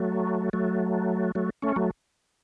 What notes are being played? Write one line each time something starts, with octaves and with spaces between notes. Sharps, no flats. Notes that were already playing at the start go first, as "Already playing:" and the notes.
Already playing: F#3 A3
F#3 A3
F#3 A3
A3 C#4
F#3 A3